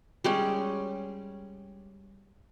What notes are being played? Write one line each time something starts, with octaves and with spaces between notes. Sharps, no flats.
G3 G#3 C#4